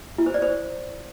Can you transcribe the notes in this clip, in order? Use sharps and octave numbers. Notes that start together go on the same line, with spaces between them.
E4
C5
D5
C5